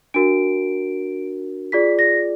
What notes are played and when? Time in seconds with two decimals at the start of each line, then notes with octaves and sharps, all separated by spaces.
0.14 D4 F#4 A#4 D7
1.72 F4 G#4 D5 B6
1.99 A#6